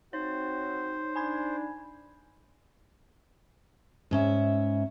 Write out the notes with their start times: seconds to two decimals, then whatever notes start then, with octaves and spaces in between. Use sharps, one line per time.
0.13 C4 D#4 F#4 C5 C#5
1.16 D4 G#5 B5 G#6
4.11 G#2 C#4 E5